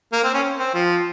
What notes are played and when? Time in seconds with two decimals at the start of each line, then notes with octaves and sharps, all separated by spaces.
0.12 A#3
0.24 C4
0.34 C#4
0.58 C4
0.74 F3